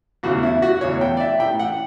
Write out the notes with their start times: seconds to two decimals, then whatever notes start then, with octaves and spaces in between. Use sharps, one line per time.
0.23 E2 C#3 E3 F#4
0.43 E4
0.62 F#4
0.81 E2 C#3 E3 C#5
1.01 G5
1.17 D5
1.20 E5
1.40 A2 E3 G5
1.59 F#5